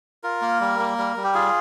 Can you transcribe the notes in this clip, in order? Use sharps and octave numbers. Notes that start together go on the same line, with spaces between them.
F4 A#4
A#3
G3
A#3
G3
G3
G4
F4 G#4